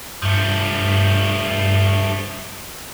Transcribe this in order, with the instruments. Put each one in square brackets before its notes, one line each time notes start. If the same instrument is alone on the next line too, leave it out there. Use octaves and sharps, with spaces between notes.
[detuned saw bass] G2 [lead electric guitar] F3 A3